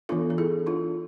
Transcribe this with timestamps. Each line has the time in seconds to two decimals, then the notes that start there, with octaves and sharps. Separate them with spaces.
0.09 E3 B3 D4 F4 A4
0.30 A4
0.38 E4 G#4
0.67 D4 F4